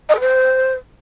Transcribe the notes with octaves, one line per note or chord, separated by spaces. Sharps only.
D#5
A4
C5